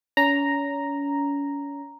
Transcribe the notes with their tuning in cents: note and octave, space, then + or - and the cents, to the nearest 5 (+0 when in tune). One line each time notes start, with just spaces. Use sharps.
C#4 +35 A#5 +0